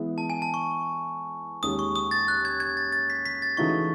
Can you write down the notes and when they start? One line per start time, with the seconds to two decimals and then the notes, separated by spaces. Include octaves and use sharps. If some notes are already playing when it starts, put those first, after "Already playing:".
Already playing: E3 G#3 B3 E4
0.18 A5
0.30 G#5
0.42 A5
0.54 C#6
1.63 D#2 D#3 G#3 C#4 D#6
1.79 C#6
1.96 D#6
2.11 A6
2.28 F#6
2.45 G#6
2.60 G#6
2.77 A6
2.92 A6
3.10 B6
3.26 B6
3.42 A6
3.57 C#3 E3 A3 D#4 F#4 C#6